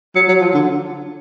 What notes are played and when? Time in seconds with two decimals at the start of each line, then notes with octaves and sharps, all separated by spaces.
0.15 F#3
0.28 F#3
0.41 F3
0.54 D3